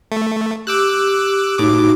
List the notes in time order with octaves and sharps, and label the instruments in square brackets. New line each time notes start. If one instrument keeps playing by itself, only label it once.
[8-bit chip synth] A3
[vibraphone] G4 [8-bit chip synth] D6 E6 F#6
[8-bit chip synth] A2 D6 [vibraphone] D#4 F#4